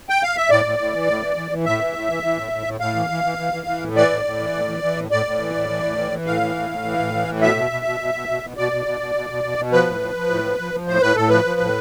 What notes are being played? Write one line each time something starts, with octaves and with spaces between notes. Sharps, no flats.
G5
F5
E5
A2 D5
A2
A2
E3
A2
E3
E3
E3
A2 E5
E3
A2
E3
E3
A2
A2
A2
A2 F5
E3
E3
E3
E3
E3
E3
A2
E3 D5
A2
A2
E3
A2
E3
E3
A2
A2 D5
A2
E3
A2
E3
A2
E3
E3
A2 F5
E3
A2
A2
E3
A2
E3
A2
B2 E5
B2
B2
B2
B2
B2
B2
B2
B2 D5
B2
B2
B2
B2
B2
B2
B2
F3 B4
A2
F3
F3
A2
F3
F3
F3
A2 C5
A2 B4
A2 A4
F3 B4
F3
A2